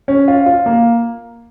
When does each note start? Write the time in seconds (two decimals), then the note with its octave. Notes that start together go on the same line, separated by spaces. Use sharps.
0.08 C#4
0.28 F4
0.46 F4
0.66 A#3